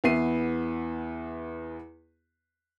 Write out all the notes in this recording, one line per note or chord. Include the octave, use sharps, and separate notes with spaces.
E2 B3 E5 C7 D#7